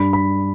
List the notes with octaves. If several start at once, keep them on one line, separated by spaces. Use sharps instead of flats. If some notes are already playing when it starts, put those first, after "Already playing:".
Already playing: G2 G3 D4 B5
B5